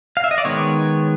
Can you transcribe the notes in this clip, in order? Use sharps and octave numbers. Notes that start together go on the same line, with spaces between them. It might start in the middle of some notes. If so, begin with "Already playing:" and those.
F5
E5
D#5
D5
D#3 G#3 B3 C#5